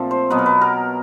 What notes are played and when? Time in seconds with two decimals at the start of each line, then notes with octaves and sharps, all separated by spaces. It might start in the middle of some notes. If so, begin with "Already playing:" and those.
Already playing: A#2 F3 A3 C4
0.11 C5
0.30 B2 F#3 B3 B4
0.39 A#4
0.46 B4
0.61 A#4